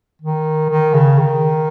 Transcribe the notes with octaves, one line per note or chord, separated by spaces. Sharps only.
D#3
D#3
C#3
D#3